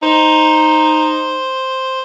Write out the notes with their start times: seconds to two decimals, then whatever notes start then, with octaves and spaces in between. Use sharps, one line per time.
0.03 D#4 C5